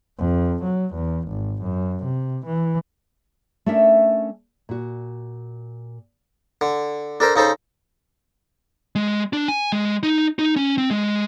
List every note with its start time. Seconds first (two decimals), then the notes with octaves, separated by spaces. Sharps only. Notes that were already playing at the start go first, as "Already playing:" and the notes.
0.18 F2
0.64 F#3
0.95 E2
1.28 G#1
1.63 F#2
2.04 C3
2.46 E3
3.66 A3 C#4 D4 A#4 E5
4.69 A#2 F#4
6.61 D3
7.20 D4 A4 A#4 C5
7.36 C#3 D#4 A4 C5
8.95 G#3
9.33 D4
9.48 G#5
9.72 G#3
10.03 D#4
10.39 D#4
10.56 C#4
10.78 C4
10.91 G#3